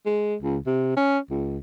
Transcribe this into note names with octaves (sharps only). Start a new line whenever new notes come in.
G#3
C#2
C3
C#4
C#2